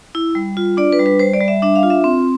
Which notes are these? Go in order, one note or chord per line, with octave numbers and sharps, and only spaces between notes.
E4
G3
F4
D4 D5
B4
G3
B4
G3 C5
D5
G3
E5
D4 E5
F5
F4
E5
C4